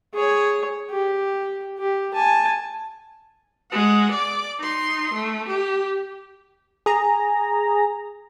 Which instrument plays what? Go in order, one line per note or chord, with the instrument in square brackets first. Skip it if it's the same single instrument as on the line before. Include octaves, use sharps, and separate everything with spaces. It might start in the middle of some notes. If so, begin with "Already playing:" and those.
[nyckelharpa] G#4 C#5
G4
G4
G#5 A5
[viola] G#3 F#5
D5 D6
D#4 C6
A3
G4
[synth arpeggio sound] G#4 A#5